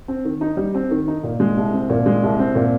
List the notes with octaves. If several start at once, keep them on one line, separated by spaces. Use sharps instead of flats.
C4
D#3
D#4
G3
C4
D#3
D#4
A#2
G#3
C2
C4
A#2
G#3
C2
C4
A#2